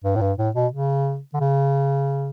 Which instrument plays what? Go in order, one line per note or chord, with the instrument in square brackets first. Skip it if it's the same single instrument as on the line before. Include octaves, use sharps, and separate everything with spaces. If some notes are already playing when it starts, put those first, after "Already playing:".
[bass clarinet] G2
A2
G2
A2
B2
C#3
D3
C#3